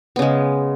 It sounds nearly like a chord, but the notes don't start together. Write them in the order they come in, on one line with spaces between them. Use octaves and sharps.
B3 C#3 G#3